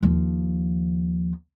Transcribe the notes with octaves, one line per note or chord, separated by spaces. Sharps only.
D#2 F3